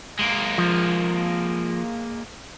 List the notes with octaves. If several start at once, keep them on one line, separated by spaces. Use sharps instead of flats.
G#3 A#3
F3